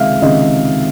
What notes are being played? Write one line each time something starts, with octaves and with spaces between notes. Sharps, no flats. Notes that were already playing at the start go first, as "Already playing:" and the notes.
Already playing: C#2 C3 D#3 G#3 E5 F5
C#2 C3 D#3 G#3 D#5